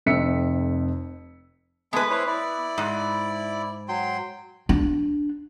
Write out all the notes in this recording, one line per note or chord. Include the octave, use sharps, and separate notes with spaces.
F1 F2 E5 E6 B6 C#7
G#3 A3 B3 B4 G#5
E4 C5 C#5
E4 D5
G#2
F#3 G5 C6
D4